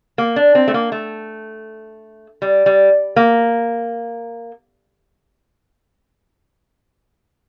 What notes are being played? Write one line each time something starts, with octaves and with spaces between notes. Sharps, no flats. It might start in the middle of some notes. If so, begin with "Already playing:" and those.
A#3
D4
C4
A3
A#3
A3
G3
G3
A#3